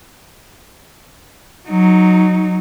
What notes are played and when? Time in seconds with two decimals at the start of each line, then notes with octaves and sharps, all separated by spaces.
1.69 F#3 D#4